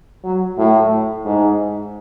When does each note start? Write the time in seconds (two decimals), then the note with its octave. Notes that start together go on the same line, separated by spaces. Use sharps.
0.24 F#3
0.58 A2
1.25 G#2